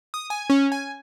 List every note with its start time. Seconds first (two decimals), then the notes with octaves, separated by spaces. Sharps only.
0.14 D#6
0.30 G#5
0.50 C#4
0.72 G#5